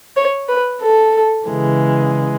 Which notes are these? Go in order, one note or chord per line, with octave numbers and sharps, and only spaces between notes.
C#5
B4
A4
C#3 E3 G#3